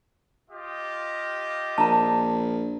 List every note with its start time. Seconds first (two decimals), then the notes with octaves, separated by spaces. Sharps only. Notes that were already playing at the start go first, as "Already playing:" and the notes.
0.50 F4 G4 D#5
1.78 A#1 A5 A#5